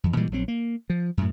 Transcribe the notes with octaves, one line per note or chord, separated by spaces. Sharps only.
F2 E3
A#2 E3 G3 G#3
A#1 F#3 C4
A#3
F3
F#2 A2